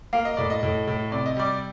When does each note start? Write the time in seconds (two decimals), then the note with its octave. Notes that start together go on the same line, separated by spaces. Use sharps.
0.13 A#3 F5
0.25 D#5
0.37 A2 D5
0.50 D#5
0.63 A2
0.87 A2
1.12 C3 D5
1.26 D#5
1.37 G3 D5